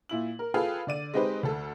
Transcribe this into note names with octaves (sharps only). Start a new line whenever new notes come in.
A#2 E4 F#7
A#4
F4 G#4 A4 B4 F5 G5
D3 D5 D#7
G#3 C4 D#4 G4 B4 C5
D2 A4